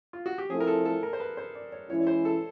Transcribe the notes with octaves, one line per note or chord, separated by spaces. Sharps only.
F4
F#4
G4
F3 A3 C4 E4 G#4
A#4
A4
A4
A#4
C5
B4
C5
D5
C#5
E3 G#3 C#4 E4 C#5
C#5
C5
A4